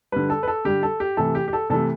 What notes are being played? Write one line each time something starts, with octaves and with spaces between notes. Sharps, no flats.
D3 G3 B4
A4
B4
A4
D3 G3 G4
A4
G4
C3 E3 A3 A4
G4
G4
A4
C3 E3 A3 A4